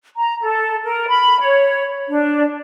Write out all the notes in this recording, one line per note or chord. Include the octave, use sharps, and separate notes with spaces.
A#5
A4
A#4
B5
C#5
D4